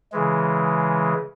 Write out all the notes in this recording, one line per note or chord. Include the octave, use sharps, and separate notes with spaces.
C#3 E3 G#3